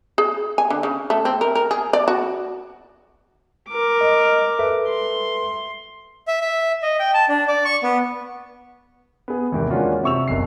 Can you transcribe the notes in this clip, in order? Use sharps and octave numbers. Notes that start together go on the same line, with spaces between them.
G#4
G#5
D3
C#3
A3
C4
A#4
A#4
G#4
D5
F#4
A#4 D6
D#5
A4 B4 E5
C6
E5
E5
D#5
G5
A5
D4
D5
C#6
B3
B3 G#4
E2 G#2 C3 D#3
G#3 A#3 C#4 D4 F4 F#4
C3 C4 C#6 E6 F7
F#1 B1 C7